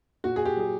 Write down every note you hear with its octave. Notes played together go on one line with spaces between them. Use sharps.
A#2 F#4
G#4
G4
F#3 G#4